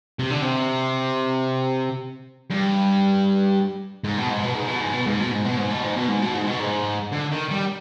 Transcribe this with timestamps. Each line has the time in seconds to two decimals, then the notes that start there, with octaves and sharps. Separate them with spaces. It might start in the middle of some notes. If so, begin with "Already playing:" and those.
0.19 C3
0.31 D3
0.42 C3
2.50 G2
4.04 G#2
4.17 B2
4.30 G#2
4.43 B2
4.55 G#2
4.68 B2
4.80 G#2
4.93 B2
5.07 G#2
5.20 B2
5.31 G#2
5.45 B2
5.58 G#2
5.70 B2
5.83 G#2
5.96 B2
6.08 G#2
6.22 B2
6.34 G#2
6.47 B2
6.60 G#2
7.12 D3
7.32 D#3
7.51 G3